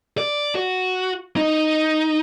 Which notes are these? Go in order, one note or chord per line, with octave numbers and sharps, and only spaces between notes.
D5
F#4
D#4